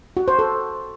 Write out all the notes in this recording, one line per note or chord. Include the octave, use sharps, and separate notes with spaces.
F#4
C5
A4